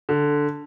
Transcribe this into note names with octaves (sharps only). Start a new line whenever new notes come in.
D3